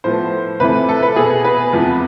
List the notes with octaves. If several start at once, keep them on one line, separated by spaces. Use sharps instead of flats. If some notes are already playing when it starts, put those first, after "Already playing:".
A2 F3 B3 C5
C3 E3 A3 B4
A4
B4
B2 B3 G#4
B4
E2 C3 F3 B3